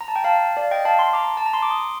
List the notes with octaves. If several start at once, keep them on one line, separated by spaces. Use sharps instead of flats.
A#5
A5
G5
F5 A5
D5 F5
D#5 G5
F5 A5
A5 C6
A#5 D6
A5
A#5
C6
D6
C6 D#6